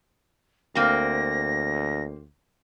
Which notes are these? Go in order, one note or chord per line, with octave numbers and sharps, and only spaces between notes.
D2 A#3 C4 A#6